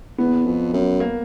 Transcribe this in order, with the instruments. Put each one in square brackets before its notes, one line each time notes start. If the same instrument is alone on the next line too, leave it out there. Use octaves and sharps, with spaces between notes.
[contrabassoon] E2 [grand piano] B3
[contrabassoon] F2
F#2
[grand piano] A#3